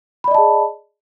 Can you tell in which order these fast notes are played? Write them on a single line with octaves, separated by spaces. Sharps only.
B5 D5 D#5 A5 G#4